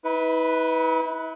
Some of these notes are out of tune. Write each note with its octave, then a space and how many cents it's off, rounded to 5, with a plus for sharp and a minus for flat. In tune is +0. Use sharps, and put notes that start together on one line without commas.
E4 -45 B4 +0